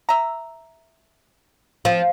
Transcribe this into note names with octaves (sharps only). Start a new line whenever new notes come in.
E5 A#5
F3 C4